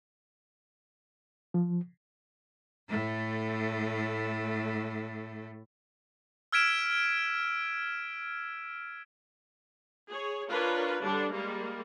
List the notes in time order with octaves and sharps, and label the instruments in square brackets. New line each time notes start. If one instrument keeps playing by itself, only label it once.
[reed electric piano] F3
[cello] A2 A3
[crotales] E6 F6 G#6 B6 D7 E7
[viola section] G#4 C#5
D4 F4 A#4 B4 C#5
D3 G3 D4
G3 G#3 A#3